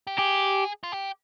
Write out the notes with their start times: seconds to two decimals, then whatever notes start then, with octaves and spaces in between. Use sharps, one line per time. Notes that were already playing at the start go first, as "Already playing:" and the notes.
0.07 G4
0.18 G4 G#4
0.84 F4
0.92 G4